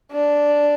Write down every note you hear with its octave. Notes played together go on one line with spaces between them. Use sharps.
D4